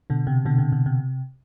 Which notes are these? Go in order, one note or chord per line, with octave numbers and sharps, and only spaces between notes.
B2 D3
C3
B2 D3
C3
B2
C3